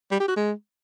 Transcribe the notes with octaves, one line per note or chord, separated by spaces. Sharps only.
G3
G4
F#4
G#3